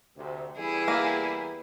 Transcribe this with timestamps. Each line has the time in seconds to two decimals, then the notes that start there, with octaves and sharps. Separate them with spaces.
0.16 D2 C3
0.57 E2 E3 G3 E4 G#4
0.88 A#3